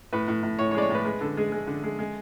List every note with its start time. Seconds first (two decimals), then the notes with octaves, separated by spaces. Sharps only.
0.13 A2 B4
0.28 A2
0.43 A2
0.59 A2 C#5
0.71 C#5
0.75 G#3 D5
0.82 C#5
0.90 A2 B4
1.05 G#3 B4
1.21 D3 A4
1.37 G#3 G#4
1.52 G#3
1.67 D3
1.84 G#3
1.99 G#3